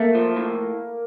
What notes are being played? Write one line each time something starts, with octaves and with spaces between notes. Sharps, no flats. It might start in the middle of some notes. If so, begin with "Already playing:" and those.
Already playing: A3 A#3
F3
A2